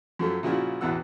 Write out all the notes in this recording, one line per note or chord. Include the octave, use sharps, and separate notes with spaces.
F#2 F3 F#3 A3
A#2 C#3 F3 E4 F#4
A1 E2 B2 E3 F#5 E6